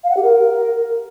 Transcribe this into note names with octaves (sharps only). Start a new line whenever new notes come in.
F5
F#5
G4
A#4